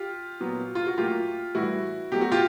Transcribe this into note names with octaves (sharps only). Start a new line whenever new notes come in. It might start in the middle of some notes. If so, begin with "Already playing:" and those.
Already playing: F4 G4
A#2 F#3 B3
F4
F#4
A2 F#3 A#3 F4 G4
A2 E3 G3 E4 F#4
B2 F#3 A3 G4
F#4
F4 G4